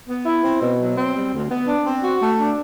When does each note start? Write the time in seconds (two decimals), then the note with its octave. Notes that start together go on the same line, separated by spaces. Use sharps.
0.09 B3
0.26 E4
0.45 C4
0.62 B2
0.80 F#3
0.97 C4
1.16 G3
1.33 D2
1.51 B3
1.68 D4
1.86 C4
2.03 F#4
2.22 A3
2.39 D4